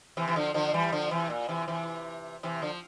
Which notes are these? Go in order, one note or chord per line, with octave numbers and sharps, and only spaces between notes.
C3 E3
E3
D3 F3
D3 F3
E3 G3
D3 F3
C3 E3
A#2
C3 E3
C3 E3
C3 E3
D3 F3